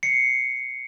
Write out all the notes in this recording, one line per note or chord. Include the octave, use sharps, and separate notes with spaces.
C7 C#7